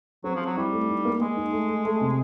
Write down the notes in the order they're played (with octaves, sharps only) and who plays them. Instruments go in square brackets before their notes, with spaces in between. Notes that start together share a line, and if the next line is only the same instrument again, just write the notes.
[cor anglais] F#3 [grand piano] C4
[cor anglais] F3
[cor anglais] F#3 [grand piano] C4
[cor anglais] G3 [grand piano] E4
[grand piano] A3
D#4
A#3
[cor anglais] G#3 [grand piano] A#3
[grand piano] D#4
A3
A3
A3
C3